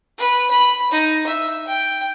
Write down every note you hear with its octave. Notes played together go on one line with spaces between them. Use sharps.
B4
B5
D#4
E5
G5